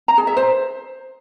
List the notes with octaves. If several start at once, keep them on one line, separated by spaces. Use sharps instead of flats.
A#5
G#4
E5
C5